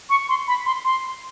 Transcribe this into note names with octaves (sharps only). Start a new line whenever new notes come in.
C#6
C6
B5
C6
C6